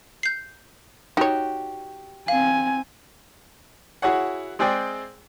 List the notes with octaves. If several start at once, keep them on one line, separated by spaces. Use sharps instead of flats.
G6 C7
D#4 F#4 G4 C#5
C4 F5 G#5
E4 F#4 G#4 C#5 F#5
G#3 C4 G#4 D5 G5